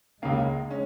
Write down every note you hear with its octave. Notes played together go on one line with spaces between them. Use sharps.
C#2 C#3 G#3 A#3 C#4
C#4